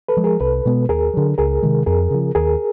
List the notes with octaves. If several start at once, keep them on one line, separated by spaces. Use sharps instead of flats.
A4 B4
F3 G#3
G#4 A#4
C2 A4 B4
B2 G#3 B3
D#2 G#4 A#4
D3 F#3
C#2 G#4 A#4
C3 D#3 G#3
F2 G#4 A#4
C#3 F3
D#2 G#4 A#4